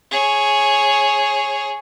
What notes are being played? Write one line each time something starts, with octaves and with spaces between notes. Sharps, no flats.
G#4 C#5